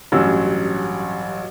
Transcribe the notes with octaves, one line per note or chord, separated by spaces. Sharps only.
A1 G2 F#3 C#4 E6